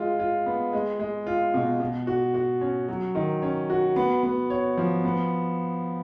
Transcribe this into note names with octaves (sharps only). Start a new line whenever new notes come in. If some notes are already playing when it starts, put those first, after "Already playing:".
Already playing: G#3 F4
F4
B3
G#3
G#3
F4
B2
B2
F#4
F#4
C#4
F#3
D#3
C#4
F#4
B3
B3
C#5
F3
B3